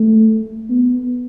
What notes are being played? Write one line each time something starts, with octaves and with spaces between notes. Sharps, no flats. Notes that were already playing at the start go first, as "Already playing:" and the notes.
Already playing: A3
B3